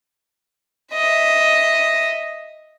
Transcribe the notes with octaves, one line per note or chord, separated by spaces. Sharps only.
D#5 E5